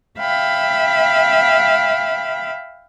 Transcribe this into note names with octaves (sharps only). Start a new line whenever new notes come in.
E5 F5 G5 B5